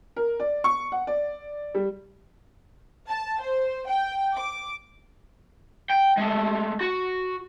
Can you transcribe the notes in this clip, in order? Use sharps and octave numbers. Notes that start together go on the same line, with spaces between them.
A#4
D5
C#6
F#5
D5
G3
A5
C5
G5
D6
G5
G#3 A3
F#4